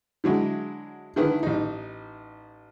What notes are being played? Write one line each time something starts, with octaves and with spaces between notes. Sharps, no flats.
D3 F#3 G#3 E4
D3 D#3 E4 G#4 B4
A1 D#4